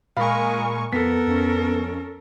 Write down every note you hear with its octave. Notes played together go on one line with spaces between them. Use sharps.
A#2 G#3 A#4 F5 G#5 B5 C#6
F2 B3 A4 A#4 B6
F2 C#4